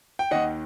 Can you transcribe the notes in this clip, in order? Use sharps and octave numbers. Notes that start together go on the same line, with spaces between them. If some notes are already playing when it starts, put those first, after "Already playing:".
G5
D#2 D#3 D#5 F#5